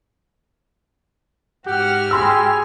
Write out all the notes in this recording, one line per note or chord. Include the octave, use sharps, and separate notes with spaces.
G#2 F#4 G4 F#5 F6
G#4 B5 C6 E6